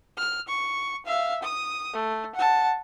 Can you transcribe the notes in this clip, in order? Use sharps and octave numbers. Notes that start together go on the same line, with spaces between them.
F6
C#6
E5 F5
D#6
A3
F#5 A5